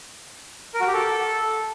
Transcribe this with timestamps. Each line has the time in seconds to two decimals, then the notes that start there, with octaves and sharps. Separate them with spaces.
0.74 A#4
0.81 F#4
0.87 G4
0.93 A4